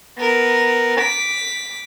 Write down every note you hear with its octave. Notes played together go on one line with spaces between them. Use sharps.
B3 A#4
D6 B6